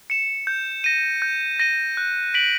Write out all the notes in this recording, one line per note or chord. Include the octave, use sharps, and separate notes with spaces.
C#7 E7
G6
A#6 D#7
G6
A#6 D#7
F#6
B6 D7 F#7